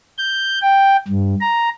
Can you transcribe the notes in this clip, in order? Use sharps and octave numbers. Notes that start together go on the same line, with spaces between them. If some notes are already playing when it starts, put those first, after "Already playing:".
G6
G5
G2
A#5